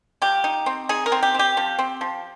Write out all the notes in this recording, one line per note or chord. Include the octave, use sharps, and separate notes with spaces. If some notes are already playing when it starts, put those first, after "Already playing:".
F3 G4
D#4
C4
D#4 G#4
A#4
C4
G4
C4 G4
F3
C4
F3